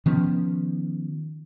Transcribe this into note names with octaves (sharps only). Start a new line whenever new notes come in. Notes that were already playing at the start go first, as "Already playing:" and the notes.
D#3 F3 B3 C#4